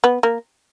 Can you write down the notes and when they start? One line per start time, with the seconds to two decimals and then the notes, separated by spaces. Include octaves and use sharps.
0.04 B3
0.23 A#3